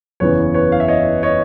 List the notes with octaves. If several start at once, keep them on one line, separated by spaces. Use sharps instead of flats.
F#1 E2 C#3 E3 B4 C#5
B4 C#5
F5
E5
C#5 D#5
C#5 D#5